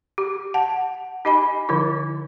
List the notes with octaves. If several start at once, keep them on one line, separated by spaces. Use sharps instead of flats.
G4
F#5 A5
D#4 G4 D#5 G#5 B5
D3 F3 D#4 E4